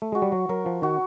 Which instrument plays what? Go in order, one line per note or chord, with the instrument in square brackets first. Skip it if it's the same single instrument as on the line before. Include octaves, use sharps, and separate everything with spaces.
[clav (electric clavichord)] A3
[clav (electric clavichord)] G#3 [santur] F#4
[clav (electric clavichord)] G3
F#3
[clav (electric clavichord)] F#3 [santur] A#4
[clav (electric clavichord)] F3
[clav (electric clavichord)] D#3 [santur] F#4